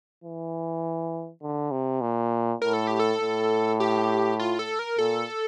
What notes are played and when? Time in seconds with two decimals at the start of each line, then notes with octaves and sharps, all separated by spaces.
0.24 E3
1.42 D3
1.71 C3
2.01 A#2
2.62 A2 A#4
2.74 A4
2.87 G4
3.00 A4
3.21 A2
3.80 G4
4.39 F4
4.59 A4
4.79 A#4
4.99 A#2 A4